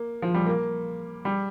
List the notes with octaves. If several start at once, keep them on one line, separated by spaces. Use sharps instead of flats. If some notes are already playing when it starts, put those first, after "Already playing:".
Already playing: A#3
F3
G3
A#3
G3